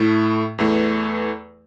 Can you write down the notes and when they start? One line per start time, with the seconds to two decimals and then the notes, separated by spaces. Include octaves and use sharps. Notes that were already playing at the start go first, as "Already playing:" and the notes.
Already playing: A2 A3 E4
0.58 E2 E3 A3